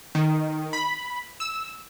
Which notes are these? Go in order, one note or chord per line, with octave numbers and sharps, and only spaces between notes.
D#3
B5
E6